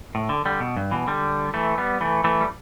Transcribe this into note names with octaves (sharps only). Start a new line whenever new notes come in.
A2
D3
D3 G3
B2
G2
B2 E3
D3 G3
E3 A3
G3 B3
E3 A3
E3 A3
G3